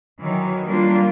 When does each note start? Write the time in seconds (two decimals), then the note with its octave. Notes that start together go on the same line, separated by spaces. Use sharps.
0.20 D#3 E3 F#3
0.66 G3 A#3 D4 F4